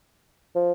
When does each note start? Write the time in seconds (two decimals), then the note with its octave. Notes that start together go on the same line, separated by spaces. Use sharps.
0.55 F3